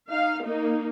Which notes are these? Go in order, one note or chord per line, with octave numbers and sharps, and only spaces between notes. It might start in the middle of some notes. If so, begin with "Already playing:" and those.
D#4 F5
A#3 D#4